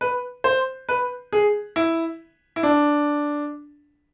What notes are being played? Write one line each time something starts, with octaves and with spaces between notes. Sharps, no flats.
B4
C5
B4
G#4
E4
E4
D4